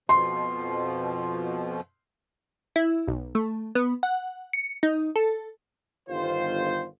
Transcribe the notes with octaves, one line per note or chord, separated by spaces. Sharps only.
F2 B2 F3 C6
E4
B1
A3
B3
F#5
C#7
D#4
A4
G1 D#3 F4 C5